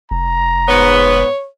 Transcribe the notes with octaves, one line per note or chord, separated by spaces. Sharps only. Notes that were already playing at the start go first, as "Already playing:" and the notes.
F1 A#5
G#2 B3 C#5